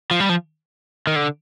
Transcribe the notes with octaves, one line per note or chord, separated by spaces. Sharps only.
F3
G3
F3
D#3
D3